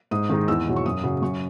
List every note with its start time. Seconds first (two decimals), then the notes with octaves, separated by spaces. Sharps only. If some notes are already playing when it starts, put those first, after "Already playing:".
0.11 G#2 D#6
0.29 D#3 G#3 D#4
0.48 E2 E6
0.67 B2 F#3
0.76 C#6
0.86 F#2 D#6
1.03 C#3 F#3
1.22 F#2 C#6